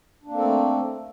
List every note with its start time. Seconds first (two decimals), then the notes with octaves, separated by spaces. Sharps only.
0.24 D4
0.28 A#3
0.32 C4
0.36 A4
0.40 A3